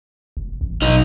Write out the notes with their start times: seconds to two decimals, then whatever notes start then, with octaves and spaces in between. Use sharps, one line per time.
0.37 F1
0.61 A1
0.82 B1 D#4